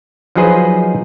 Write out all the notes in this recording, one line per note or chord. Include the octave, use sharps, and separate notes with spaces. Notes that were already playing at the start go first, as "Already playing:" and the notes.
F3 F#3 D#4 G#4 B4 C5